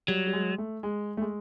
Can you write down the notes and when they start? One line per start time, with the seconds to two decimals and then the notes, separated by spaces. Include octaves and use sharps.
0.08 F#3 G3
0.27 G3
0.33 G#3
0.58 A3
0.83 G#3
1.17 A3
1.22 G#3